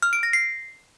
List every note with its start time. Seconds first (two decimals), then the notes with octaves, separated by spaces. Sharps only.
0.02 F6
0.13 D7
0.23 A#6
0.33 C7